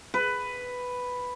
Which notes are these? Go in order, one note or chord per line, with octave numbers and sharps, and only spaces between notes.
B4